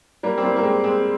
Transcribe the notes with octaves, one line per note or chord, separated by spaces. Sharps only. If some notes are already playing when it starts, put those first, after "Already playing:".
G3 A#3
C4
G3 A#3
A#3
G#3 C4
G#3 C4